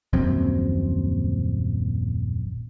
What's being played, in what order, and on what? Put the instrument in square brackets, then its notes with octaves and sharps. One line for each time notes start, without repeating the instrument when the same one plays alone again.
[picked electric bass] D#1 A#1 F#2 C4